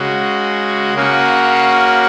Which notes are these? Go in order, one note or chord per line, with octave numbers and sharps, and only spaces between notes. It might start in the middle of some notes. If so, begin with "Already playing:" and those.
Already playing: C#3 G#3 F#4
C#3 A#3 C#4 F#4